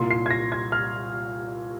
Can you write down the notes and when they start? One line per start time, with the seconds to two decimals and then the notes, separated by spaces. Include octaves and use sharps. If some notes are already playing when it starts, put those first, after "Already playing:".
Already playing: C2 A#2 A#3 C6
0.11 C7
0.26 G#6
0.31 A#6
0.52 G#6
0.72 F6